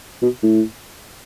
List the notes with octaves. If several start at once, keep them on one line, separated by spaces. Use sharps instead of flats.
B2
A2